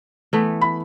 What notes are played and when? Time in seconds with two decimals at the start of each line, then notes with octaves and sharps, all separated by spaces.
0.33 E3 A3 B3
0.61 B5